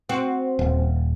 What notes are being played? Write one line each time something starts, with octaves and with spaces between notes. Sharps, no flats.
C4 F#4
D#1